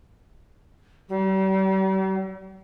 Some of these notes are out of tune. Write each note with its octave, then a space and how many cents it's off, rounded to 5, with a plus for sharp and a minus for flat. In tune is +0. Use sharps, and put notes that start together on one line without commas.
G3 -40